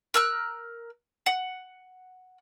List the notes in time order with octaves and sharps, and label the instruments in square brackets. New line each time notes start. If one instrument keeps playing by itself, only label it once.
[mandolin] A#4 E6 F#6
F#5